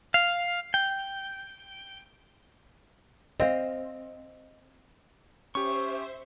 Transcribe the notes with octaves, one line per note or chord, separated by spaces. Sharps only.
F5
G5
C4 D#5 F5
C#4 G4 C5 E5 C#6